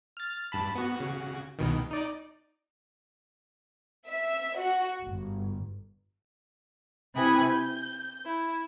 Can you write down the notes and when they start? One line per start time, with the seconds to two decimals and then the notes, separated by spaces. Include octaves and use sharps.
0.17 F6 A6
0.52 G2 A5 B5
0.75 B3 F#4
0.96 C#3 F#4
1.59 C2 B2 D#3
1.91 D#4 D5
4.08 E5
4.57 F#4
5.03 G1
7.15 C3 E4 B4 G#5 B5 D#6
7.47 G6
8.26 E4